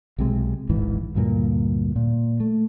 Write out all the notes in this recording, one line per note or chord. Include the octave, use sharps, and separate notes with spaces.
B1 C3 G#3
D1 G#1 G#2 E3
D2 G2 A#2 A#3
A#2
A3